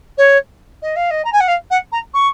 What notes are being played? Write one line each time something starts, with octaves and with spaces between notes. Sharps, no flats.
C#5
D#5
F5
D#5
A#5
G#5
F#5
F5
F#5
A#5
C#6